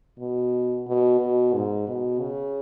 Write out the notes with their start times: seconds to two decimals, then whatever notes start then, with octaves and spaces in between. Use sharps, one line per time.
0.19 B2
0.87 B2
1.19 B2
1.53 G#2
1.88 B2
2.20 C#3